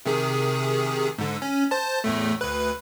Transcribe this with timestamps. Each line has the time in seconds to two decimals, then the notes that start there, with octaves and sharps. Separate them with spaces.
0.06 C3 D#3 G#4
1.18 G#2 D3
1.42 C#4
1.71 C5 A5
2.04 E2 A2 A3
2.41 D2 B4